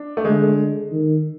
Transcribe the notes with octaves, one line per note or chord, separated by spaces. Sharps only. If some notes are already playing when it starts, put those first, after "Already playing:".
Already playing: D4
A3
D3 G#3
D#3